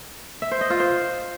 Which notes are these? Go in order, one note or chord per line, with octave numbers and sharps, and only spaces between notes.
E5
C5
D#5
F4
C5